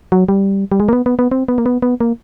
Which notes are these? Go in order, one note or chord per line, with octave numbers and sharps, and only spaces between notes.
F#3
G3
G3
G#3
A#3
B3
B3
B3
C4
B3
A#3
B3
B3
A#3